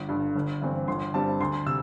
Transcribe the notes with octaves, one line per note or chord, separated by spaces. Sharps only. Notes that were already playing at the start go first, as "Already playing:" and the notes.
Already playing: G1
G2 D3
G1
G2 E3 C4
G1 C6
G2 G3 C4 A5
D2 C6
C3 E6